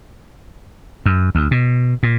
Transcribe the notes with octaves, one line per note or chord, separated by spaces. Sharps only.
F#2
D2
B2
A#2